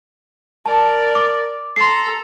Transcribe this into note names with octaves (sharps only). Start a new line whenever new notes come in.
A#4 D5 A5
D6
A4 A#5 C6 C7